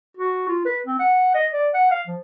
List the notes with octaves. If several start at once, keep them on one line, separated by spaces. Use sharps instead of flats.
F#4
F4
B4
C4
F#5
D#5
D5
F#5
F5
F3